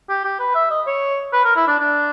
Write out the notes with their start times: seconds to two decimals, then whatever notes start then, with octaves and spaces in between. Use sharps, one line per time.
0.09 G4
0.24 G4
0.39 B4
0.55 E5
0.71 D#5
0.87 C#5
1.33 B4
1.44 A#4
1.56 E4
1.67 D4
1.79 D4